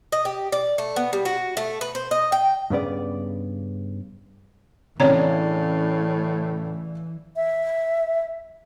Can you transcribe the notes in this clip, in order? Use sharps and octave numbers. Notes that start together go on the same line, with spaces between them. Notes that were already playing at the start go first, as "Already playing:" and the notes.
D#5
G4
D5
A3
B3
G3
F#4
A3
B4
C5
D#5
G5
G2 C#3 B3 D5
A2 C#3 E3 C4 D4 C#5 A#5
E5